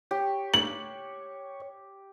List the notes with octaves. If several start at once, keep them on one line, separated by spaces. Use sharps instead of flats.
G4 C#5
F#7